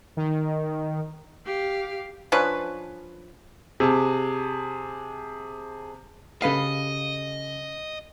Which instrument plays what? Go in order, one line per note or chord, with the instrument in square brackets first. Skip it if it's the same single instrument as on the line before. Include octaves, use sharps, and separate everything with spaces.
[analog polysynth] D#3
[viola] G4 F5
[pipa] F3 C#4 D4 B4
[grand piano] C3 [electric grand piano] G#4 A5
[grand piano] C#3 G4 [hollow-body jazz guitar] A4 B4 F5 [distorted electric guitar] D#5